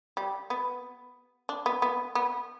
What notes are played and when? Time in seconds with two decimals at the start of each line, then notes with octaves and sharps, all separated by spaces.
0.17 G3
0.50 B3
1.49 D4
1.66 B3
1.82 B3
2.15 B3